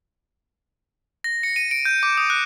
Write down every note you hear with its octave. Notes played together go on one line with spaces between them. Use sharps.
A#6
C#7
D#7
D7
G6
D6
D#6
F#6